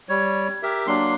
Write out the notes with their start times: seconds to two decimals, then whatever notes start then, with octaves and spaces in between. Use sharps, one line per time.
0.09 G3 C#5
0.63 G4 A#4 E5
0.87 F#3 A#3 D4 C6